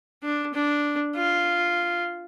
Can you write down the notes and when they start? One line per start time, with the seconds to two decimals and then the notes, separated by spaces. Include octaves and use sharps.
0.23 D4
0.54 D4
1.15 F4